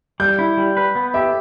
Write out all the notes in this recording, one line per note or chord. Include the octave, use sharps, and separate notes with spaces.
G3 G6
E4
G3
B4
B3
G4 E5